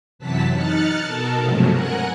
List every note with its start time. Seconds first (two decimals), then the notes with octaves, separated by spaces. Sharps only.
0.19 F#2 C3 E3 F#3 A5 B6
0.54 D#4 F6 F#6 A6 C#7
1.01 B2 A4 A#4 A5
1.39 G2 C3 F3 F#3 G#3 A3
1.69 A#4 F#5 G#5 F#6